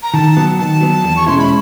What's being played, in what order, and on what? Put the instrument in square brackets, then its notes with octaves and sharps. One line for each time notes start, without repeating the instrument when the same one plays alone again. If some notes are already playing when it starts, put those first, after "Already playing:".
[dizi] A#5
[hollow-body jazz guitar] D#3 [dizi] A5
[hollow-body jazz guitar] F#3 B3
[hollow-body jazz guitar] D#3 [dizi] A5
[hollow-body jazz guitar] F#3 B3
E2
[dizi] C#6
[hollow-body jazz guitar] B2 G#3 C#4 E4 [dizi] C6
[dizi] B5